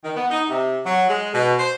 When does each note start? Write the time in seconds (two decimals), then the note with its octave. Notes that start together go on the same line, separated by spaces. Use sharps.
0.04 D#3
0.16 B3
0.29 D#4
0.49 C3
0.85 F#3
1.08 G#3
1.34 B2
1.59 C5